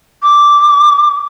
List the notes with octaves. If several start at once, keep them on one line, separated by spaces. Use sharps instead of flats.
D6